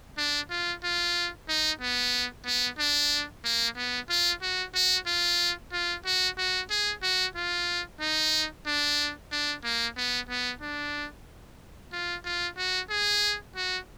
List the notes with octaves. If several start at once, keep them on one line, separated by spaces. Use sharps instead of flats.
D4
F4
F4
D#4
B3
B3
D4
A#3
B3
F4
F#4
F#4
F4
F4
F#4
F#4
G#4
F#4
F4
D#4
D4
D4
A#3
B3
B3
D4
F4
F4
F#4
G#4
F#4